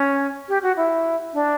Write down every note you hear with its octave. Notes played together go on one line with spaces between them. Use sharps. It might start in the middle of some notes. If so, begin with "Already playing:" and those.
Already playing: C#4
G4
F#4
E4
D4